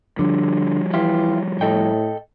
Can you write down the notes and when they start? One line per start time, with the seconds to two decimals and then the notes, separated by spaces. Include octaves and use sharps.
0.19 D3 F3 G3
0.94 E3 E4 F4 G4
1.61 A2 A4 D#5 G5